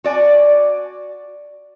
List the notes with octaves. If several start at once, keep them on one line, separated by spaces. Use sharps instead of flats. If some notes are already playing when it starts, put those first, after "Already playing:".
F#4 D5 G#5